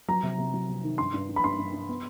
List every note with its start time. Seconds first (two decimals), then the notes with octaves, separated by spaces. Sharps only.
0.08 F#3 A#5
0.23 C3
0.38 C3
0.54 F#3
0.69 C3
0.83 D#3
0.98 G2 C6
1.14 G2
1.29 G2
1.36 B5
1.44 G2 C6
1.58 G2
1.73 G2
1.89 B3